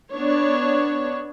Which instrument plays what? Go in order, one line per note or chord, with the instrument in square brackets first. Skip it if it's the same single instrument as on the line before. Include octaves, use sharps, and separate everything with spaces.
[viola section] B3 D4 C#5